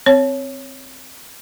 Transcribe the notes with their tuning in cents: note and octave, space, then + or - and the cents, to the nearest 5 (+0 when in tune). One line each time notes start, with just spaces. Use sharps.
C4 +0 C#5 +0